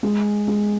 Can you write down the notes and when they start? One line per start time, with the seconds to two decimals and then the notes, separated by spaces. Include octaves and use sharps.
0.03 G#3
0.48 G#3